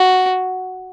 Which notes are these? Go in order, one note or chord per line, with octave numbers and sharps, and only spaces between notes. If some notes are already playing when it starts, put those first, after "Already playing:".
Already playing: F#4